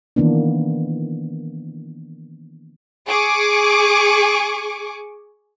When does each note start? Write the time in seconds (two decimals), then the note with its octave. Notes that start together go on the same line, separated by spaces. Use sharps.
0.16 D#3 E3 A#3 B3 D4
3.07 G#4 C#6 D6